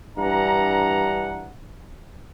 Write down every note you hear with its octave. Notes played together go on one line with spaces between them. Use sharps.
G2 E3 D4 F#5 A#5